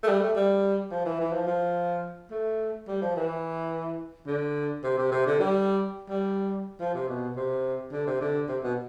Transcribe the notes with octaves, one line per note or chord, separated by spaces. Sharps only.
A3
G3
A3
G3
F3
E3
E3
F3
F3
A3
G3
F3
E3
D3
C3
C3
C3
D3
G3
G3
F3
C3
B2
C3
D3
C3
D3
C3
B2